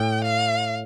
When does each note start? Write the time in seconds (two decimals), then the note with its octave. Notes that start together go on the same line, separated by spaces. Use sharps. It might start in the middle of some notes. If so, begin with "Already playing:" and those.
Already playing: A2 G5
0.24 F5